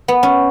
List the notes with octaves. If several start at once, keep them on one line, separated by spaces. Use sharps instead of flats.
B3
C#4